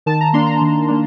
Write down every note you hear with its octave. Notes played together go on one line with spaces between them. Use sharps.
D#3 A5
A#5
A#3 D4 C6
A#5
D#3
A#3 D4